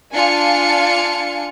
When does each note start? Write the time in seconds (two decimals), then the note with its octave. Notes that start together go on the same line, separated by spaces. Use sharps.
0.13 D4 F4 F5 G#5 C#7